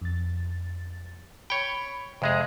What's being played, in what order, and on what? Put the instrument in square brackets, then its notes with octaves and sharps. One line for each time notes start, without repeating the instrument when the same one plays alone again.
[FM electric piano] F2 A6
[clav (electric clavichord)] C#5 G5 [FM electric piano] B5 C#6
[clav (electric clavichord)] F2 G#3 G#4 [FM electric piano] C3 E5 A#6